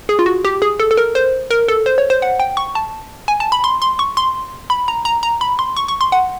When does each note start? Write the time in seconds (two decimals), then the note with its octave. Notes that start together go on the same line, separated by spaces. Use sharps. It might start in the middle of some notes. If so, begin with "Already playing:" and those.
0.09 G#4
0.19 F4
0.26 F#4
0.45 G4
0.62 G#4
0.80 A4
0.91 A4
0.97 A#4
1.15 C5
1.51 A#4
1.68 A4
1.86 C5
1.98 C#5
2.10 C5
2.22 F#5
2.40 G5
2.57 C#6
2.75 A5
3.28 G#5
3.40 A5
3.52 B5
3.64 C6
3.82 C6
3.99 C#6
4.17 C6
4.70 B5
4.88 A#5
5.05 A#5
5.23 A#5
5.41 B5
5.59 C6
5.77 C#6
5.88 C#6
6.01 C6
6.12 F#5